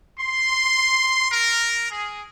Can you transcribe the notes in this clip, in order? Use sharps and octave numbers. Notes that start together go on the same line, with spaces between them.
C6
A#4
G#4